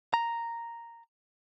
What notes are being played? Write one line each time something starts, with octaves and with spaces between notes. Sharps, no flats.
A#5